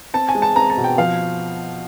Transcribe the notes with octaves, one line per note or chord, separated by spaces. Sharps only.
C4 A5
G#5
G#3
A5
C4 A#5
A5
B2
G5
F3 F5